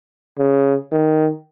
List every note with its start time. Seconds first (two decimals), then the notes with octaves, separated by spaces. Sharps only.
0.38 C#3
0.92 D#3